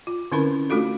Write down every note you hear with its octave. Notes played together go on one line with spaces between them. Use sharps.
F4
D3 C4 C#4 E4 A#4 B5
A3 D4 F4 F#4 A4